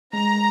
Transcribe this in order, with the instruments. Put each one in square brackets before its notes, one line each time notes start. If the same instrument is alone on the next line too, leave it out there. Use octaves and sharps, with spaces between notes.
[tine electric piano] G#3 [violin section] A#5